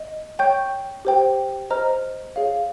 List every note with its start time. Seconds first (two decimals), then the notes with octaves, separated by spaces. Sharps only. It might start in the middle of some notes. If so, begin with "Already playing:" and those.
Already playing: D#5
0.39 C#5 G5 C#6 G6
1.05 G4 C5 G5
1.70 C5 D#5 A#5 F6
2.36 G#4 C#5 F5